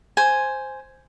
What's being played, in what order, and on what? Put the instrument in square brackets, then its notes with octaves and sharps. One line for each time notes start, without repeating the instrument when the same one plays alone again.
[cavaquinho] C5 G#5